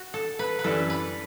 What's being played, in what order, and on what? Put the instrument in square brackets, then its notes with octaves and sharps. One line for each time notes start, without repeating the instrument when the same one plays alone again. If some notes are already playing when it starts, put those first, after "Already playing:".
Already playing: [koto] F#4
A4
B4
B4
[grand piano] F#2 E3 G3 D4 [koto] A4
[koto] B4